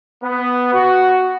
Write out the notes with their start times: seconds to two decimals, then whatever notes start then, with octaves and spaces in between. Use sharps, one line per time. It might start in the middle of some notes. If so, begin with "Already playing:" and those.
0.23 B3
0.73 F#4